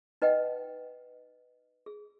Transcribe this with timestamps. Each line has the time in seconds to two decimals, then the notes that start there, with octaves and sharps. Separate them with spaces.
0.22 D#4 B4 D#5 F#5 G5
1.86 G#4